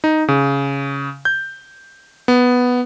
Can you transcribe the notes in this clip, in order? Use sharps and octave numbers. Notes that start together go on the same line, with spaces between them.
D#4
C#3
G6
B3